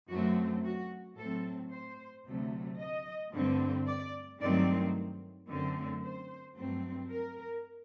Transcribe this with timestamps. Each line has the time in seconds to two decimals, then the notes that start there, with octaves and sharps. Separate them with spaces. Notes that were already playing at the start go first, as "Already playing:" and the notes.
0.10 F#2 F#3 A3 C4 F#4
0.64 F#4
1.18 A2 F#3 C4 A4
1.72 C5
2.25 D2 C3 F#3 A3
2.79 D#5
3.33 G2 D3 A3 C4
3.87 D5
4.41 G2 D#3 F#3 A3 C4 D5
5.48 F#2 D3 A3 C4
6.02 C5
6.56 G2 F#3 A3 C4
7.10 A#4